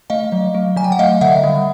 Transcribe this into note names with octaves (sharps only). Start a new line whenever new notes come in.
A3 D#5 F5
F#3
A3
F#3 G#5
G5
F#5
A3 D#5 F5
D3 E5 F#5
G3